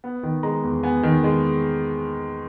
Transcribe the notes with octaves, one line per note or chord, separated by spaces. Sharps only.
B3
D#3
G#3 A#5
E2
B3 G#5
D#3
G#3